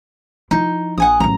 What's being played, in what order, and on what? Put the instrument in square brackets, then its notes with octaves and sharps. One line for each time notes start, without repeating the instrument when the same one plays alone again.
[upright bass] F3 E4 [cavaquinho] D#4
[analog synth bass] A#1 [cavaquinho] F#5 G#5 D#6
[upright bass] A1 F#3 [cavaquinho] A#5